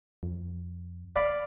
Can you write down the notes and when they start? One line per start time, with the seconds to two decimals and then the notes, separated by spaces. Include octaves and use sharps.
0.23 F2
1.16 D5 F5 B5